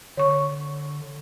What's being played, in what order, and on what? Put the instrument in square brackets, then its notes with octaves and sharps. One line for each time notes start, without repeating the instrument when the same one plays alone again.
[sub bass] D3 [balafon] C#5 C#6